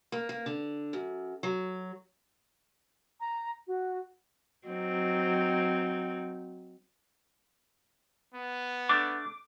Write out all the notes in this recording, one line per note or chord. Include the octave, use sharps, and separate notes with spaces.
A#3
A#3
D3
F#2
F#3
A#5
F#4
F#3 C4 D#4
B3
A3 D4 D6